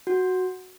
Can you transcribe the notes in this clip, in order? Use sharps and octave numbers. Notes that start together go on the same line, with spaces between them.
F#4